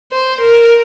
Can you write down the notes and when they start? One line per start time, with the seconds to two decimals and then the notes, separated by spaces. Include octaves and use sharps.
0.12 C5
0.41 A#4